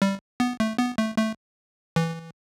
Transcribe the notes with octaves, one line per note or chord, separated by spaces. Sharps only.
G3
B3
A3
B3
A3
A3
E3